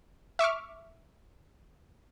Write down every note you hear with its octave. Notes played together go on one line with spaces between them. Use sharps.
E5 C#6 D6 F6